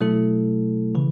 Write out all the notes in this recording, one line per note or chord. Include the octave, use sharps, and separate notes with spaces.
B2 F#3 A3 E4 A4
C#3 E3